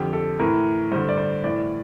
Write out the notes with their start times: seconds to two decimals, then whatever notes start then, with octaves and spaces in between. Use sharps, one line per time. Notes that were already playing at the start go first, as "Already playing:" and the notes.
Already playing: F2 D3 G4
0.13 A4
0.39 A2 E3 A#4
0.92 G2 D3 C5
1.09 D5
1.17 C5
1.44 A2 E3 D5